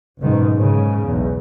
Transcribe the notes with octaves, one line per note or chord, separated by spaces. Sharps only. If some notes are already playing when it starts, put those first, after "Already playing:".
F#1 G#2 B2 D#3
G#2 C#3
B1 E2